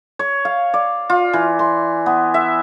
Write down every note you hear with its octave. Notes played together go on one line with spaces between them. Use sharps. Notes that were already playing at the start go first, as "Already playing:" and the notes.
C#5
F5
D5
F4
E3
C6
B3
E5